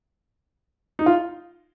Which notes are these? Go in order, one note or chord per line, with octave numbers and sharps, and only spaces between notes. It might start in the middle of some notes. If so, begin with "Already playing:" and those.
D#4
F4